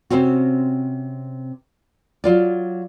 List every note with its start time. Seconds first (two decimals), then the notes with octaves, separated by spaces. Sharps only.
0.10 C3 C4 C#4 F#4
2.24 F#3 F4 D5